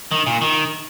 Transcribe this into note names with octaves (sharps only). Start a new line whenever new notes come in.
D#3
A#2
D#3